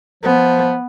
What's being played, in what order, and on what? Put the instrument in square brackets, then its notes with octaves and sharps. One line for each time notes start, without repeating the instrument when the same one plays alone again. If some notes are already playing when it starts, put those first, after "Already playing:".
[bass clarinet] F3 [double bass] B3